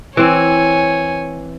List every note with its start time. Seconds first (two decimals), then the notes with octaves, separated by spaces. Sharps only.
0.17 E3 C4 C#5 G#5